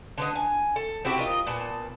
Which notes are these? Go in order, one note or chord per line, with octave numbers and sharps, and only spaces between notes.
D3 B3 D#4
G#5
A4
C4 E4 F#4 G4
F4 A#4 D#5
A#2 B3 A5